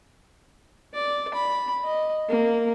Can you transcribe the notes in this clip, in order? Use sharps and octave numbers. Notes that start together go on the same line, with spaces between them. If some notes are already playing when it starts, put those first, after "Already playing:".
D5
B5
D#5
A#3